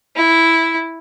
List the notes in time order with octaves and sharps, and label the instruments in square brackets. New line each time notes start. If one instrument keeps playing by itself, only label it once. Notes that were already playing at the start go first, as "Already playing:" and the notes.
[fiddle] E4